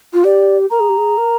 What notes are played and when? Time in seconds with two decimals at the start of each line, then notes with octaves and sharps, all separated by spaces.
0.13 F4
0.24 G4 D5
0.71 A#4 A#5
0.80 G#4
0.89 G4
0.97 G#4
1.18 A#4